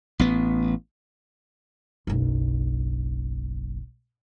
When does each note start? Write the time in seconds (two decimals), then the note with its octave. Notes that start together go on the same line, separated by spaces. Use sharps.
0.19 A1 B3
2.07 F#1 B1